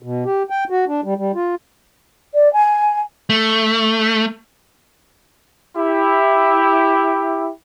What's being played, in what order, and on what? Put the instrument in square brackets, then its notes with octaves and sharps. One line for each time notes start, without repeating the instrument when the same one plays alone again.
[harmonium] B2
G4
G5
F#4
D4
G3
G3
F4
[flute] D5
G#5
[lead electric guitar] A3
[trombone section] E4 G4